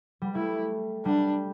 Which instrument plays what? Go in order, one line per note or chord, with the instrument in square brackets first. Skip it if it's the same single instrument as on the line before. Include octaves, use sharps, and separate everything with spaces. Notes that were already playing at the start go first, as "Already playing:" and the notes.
[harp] G3
[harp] A3 [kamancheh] E4
[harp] G3 [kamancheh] D4